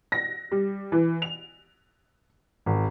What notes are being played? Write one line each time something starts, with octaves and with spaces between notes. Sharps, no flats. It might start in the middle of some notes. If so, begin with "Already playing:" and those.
A#6
G3
E3
F7
G#1